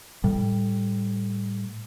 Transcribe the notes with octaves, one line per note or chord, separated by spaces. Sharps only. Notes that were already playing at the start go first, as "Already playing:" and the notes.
A2 G3